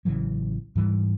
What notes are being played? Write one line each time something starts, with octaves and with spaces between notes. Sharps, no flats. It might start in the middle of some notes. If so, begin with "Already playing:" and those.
A1 C#3 E3 F#3
G#2 E3 G3